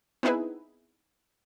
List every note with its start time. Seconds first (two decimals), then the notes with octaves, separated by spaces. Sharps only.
0.23 B3 C4 D#4 E4 G#4 B4